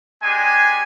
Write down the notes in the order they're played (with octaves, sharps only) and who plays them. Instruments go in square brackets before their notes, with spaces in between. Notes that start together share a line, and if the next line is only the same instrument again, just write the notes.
[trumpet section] G#3 D4 G4 G#5